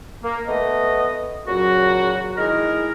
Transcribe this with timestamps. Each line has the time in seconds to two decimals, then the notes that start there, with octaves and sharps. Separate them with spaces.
0.23 A#3
0.47 A3 B3 B4 D#5
1.47 A#2 C#3 F#3 F#4
2.37 D#3 G#3 E4 G#4 A#4